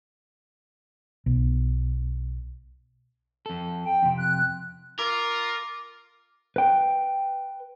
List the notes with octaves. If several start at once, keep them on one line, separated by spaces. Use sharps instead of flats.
B1
F2 A4
G5
F2 C3
F#6
F4 A#4 D6
B4 G5